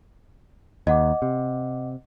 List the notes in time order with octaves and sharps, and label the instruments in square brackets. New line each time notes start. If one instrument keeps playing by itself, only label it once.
[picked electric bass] D#2 [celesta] D#5 F#5 D6
[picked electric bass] C3